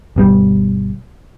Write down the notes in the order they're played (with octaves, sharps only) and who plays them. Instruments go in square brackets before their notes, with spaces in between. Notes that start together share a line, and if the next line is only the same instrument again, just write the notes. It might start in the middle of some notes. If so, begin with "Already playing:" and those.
[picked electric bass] G1 B2 G3